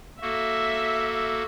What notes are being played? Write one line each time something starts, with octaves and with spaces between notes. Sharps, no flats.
A#3 F#4 A4 E5